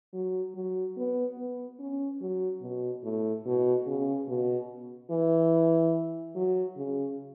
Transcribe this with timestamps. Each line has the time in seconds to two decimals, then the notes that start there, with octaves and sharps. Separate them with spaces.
0.13 F#3
0.55 F#3
0.97 B3
1.38 B3
1.80 C#4
2.21 F#3
2.62 B2
3.04 A2
3.46 B2
3.87 C#3
4.28 B2
5.11 E3
6.36 F#3
6.77 C#3